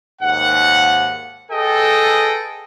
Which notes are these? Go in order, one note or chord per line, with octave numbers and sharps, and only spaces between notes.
D#2 G#2 F#5
G#4 A4 B4 D#5 G5